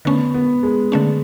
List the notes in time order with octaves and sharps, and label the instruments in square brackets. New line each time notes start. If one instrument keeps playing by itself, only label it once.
[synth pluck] D3 A3 C#4 [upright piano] B3
[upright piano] B3
G#3
[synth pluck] D3 A3 C#4